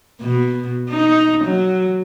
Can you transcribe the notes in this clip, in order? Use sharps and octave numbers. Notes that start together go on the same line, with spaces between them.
B2
D#4
F#3